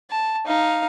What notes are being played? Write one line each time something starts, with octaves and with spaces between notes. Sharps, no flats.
A5
D#4 F5